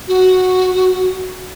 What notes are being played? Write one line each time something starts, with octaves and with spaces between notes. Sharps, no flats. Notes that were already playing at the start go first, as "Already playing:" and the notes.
F#4